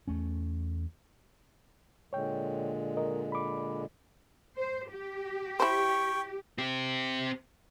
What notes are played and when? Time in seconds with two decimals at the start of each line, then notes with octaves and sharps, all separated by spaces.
0.08 E2 A3 C#4
2.13 A#2 D3 G#3 C#5 G5
2.97 A#4 D#5
3.32 B5 D6
4.56 C5
4.92 G4
5.60 E4 C5 G5 C#6
6.58 C4 G4